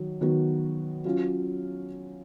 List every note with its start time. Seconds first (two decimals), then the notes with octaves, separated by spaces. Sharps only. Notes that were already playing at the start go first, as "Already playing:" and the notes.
Already playing: D#3 F#3
0.21 D#3 F#3 B3 F#4
1.05 F#3 C#4 F4